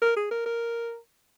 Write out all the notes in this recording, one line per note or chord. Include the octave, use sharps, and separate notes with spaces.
A#4
G#4
A#4
A#4